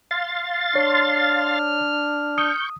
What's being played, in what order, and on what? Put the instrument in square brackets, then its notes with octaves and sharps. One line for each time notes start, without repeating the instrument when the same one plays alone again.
[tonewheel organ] F5 C6 A6
[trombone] D4 [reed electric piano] C#5 [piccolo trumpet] F6
[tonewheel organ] C#6 G6 [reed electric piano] D#6